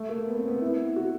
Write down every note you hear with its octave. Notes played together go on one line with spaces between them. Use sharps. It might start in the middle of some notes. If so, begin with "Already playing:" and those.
Already playing: A3
A#3
B3
C4
B3
E4
F#4